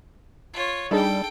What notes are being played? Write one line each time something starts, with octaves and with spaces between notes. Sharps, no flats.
F4 C#5
G3 D4 D#4 G#4 A4 G5